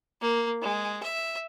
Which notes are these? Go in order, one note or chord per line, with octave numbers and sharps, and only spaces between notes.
A#3
G#3
E5